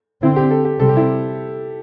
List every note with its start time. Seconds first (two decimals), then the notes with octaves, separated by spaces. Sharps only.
0.22 D3 C4 E4
0.36 G4
0.51 A4
0.65 G4
0.79 C3 G3 C4 A4
0.89 G4
0.97 E4